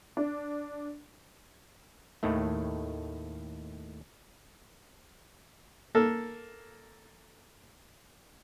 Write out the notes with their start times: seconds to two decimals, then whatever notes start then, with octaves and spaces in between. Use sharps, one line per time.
0.17 D4
2.23 D#2 A2 D#3 A3
5.95 A#3 A4